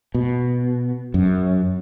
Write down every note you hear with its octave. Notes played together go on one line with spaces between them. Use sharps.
B2
F#2